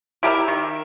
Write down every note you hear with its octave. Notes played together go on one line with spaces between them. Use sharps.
E4 G4 A#4 E5
D#3